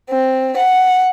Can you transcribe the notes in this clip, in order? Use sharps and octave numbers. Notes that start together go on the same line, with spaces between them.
C4
F#5